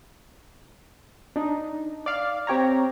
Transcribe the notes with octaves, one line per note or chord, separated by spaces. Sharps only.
D4 D#4
D5 F5
C4 G4 C#5 A#5